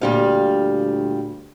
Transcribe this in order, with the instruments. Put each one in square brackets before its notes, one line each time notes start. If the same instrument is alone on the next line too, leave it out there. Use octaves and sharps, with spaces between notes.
[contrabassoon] D2 [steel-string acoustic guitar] A#2 G3 F5